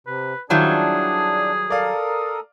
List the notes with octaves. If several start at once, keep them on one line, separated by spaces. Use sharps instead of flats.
C3 B4
D#3 F#3 G3 D4 E4 F4 G#4 C5
A4 A#4 D5 F5 D#6